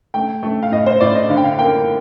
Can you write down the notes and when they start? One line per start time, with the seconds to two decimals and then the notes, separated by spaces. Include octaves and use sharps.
0.14 A3 G5
0.43 A3
0.63 F5
0.72 A2 D#5
0.86 C5
1.01 A2 D5
1.15 D#5
1.29 D3 F5
1.37 G5
1.44 F5
1.59 A#3 G5